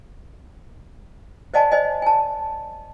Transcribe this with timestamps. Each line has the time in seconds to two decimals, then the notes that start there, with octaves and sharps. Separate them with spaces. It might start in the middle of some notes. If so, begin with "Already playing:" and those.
1.54 C5 D5 D#5 F#5 G#5 A5
1.71 C5 D5 D#5 G#5
2.02 G#5 A5